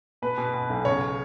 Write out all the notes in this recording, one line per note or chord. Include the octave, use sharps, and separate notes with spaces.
B2 B4
B2
B2
B1
C#3 C#5